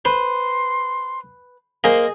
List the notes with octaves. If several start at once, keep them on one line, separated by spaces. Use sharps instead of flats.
B4 C5 C6
A#3 G#4 C5 D#5